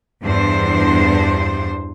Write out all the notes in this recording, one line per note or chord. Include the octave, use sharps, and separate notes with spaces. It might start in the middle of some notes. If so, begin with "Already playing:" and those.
E2 G2 D4 C5